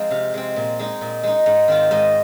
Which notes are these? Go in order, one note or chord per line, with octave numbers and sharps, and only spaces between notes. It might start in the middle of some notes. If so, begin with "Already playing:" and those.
Already playing: F3 G#3 C4 D#4 F4 G#4
C3 F5
G#3 C4
A#2
G#3 D#4
A#2
G#3 D#4
G#2
D#3 C4 F4
G#2 D#5